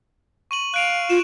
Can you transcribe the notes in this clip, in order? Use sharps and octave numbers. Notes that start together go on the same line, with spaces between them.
C#6 D#7 F#7
F5 F#6 D7 F7
F4 E7